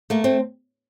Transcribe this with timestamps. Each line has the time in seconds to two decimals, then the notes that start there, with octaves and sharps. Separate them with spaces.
0.10 A3 A#3
0.24 C4